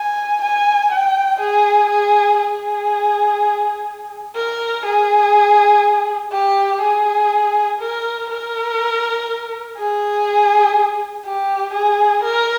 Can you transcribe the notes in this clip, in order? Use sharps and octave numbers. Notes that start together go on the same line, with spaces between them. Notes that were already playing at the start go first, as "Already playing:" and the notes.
Already playing: G#5
G#5
G5
G#4
G#4
G#4
A#4
G#4
G4
G#4
A#4
A#4
G#4
G4
G#4
A#4